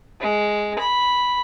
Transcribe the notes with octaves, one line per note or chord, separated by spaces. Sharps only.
G#3
B5